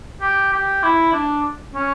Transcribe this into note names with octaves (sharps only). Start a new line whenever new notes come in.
G4
G4
E4
D4
C#4